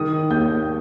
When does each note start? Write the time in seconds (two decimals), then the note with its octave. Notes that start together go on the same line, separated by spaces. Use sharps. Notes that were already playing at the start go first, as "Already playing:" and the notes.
Already playing: D#3 D#6
0.30 D#2 G6